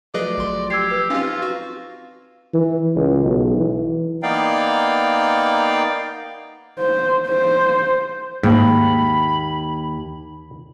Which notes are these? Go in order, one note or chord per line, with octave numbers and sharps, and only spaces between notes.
F3 F#3 A3 G#4 B4 D5 D#5
G#1 C6
G4 E6 G#6 C7
B4 E6
C4 C#4 D#4 F4 G4
F#4
E3
C#2
B1
E3
A#3 B3 D#4 D5 F5 G5
C5
C5
D#2 G#2 B5